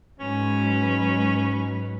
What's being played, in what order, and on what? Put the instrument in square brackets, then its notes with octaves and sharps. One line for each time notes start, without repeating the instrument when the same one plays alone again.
[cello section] G#2 F#3 B4 [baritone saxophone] C#4